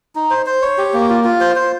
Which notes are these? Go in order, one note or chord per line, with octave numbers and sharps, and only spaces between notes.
D#4
C5
C5
C#5
G4
A#3
F4
F4
C5
C5